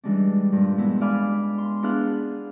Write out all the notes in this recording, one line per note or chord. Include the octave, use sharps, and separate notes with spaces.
E3 G3 G#3 C#4 D4
G2 A#2
G#3 B3 E4
D5 F5 G#5 B5 D6
C6
B3 D4 E4 G#4 F5 F#6